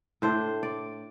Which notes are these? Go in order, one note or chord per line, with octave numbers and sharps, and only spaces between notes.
A2 A3 D4 C5
D5